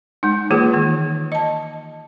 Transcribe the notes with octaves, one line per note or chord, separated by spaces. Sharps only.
G#3 D#4
E3 A#3 F4 G#4 B4
D#3 A#3
D#5 A5